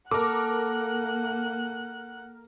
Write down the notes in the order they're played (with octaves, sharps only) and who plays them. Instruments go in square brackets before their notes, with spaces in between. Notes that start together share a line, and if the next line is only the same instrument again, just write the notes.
[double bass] A#3 [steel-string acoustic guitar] A4 [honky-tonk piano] A#4 D6 [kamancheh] F#5 F#6